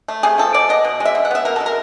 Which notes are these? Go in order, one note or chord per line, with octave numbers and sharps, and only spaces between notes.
A3
C3 G#4
F3 A4
B2 D5
B3 D#5
B2
G#3
E5
B2
F#5
B3 E5
B2 A#4
A4
G#3
A#4